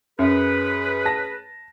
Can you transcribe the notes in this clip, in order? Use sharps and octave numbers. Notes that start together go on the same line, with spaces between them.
F#2 C#4 G#4 B4
A5 A#6